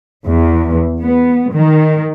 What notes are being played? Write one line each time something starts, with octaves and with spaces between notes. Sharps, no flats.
E2
B3
D#3